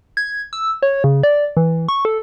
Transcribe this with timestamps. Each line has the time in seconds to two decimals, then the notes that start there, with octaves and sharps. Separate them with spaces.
0.17 G#6
0.53 E6
0.83 C#5
1.04 C#3
1.23 D5
1.57 E3
1.89 C#6
2.05 A4